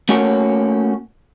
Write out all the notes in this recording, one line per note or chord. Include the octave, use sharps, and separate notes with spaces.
A3 A#3 C#4 F#4 C#5